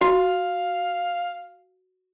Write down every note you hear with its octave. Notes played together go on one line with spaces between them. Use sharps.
F#4 F5